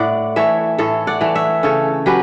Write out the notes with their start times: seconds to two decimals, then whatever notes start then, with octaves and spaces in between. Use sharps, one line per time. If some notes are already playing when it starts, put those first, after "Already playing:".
Already playing: A2 D5 F#5
0.36 E3 A3 C#5 E5
0.79 A2 A4 C#5
1.07 D5 F#5
1.21 E3 A3
1.35 C#5 E5
1.63 C#3 A4 C#5
2.06 F#3 C#4 G4 B4